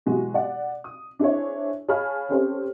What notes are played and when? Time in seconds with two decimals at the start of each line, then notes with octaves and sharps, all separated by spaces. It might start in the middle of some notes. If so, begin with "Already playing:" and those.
0.06 B2 E3 F#3 G#3 F#4 G4
0.34 D5 F#5
0.84 D#6
1.19 D4 E4 G#4 C5 C#5
1.88 G#4 C#5 F5 A5 B5 F6
2.29 C4 C#4 G4 A4 C5 C#5